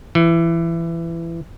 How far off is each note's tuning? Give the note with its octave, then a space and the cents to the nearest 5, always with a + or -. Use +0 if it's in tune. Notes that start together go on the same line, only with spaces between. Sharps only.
E3 +20